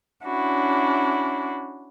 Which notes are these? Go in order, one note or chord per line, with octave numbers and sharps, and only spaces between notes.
C#4 D4 E4 F#4